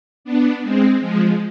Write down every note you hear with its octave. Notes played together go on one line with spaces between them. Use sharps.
B3 D4
G#3 C4
F3 G#3